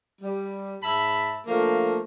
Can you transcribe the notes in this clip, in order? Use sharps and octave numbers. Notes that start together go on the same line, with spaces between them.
G3
G#2 E5 A5 B5
D3 F3 A3 A#3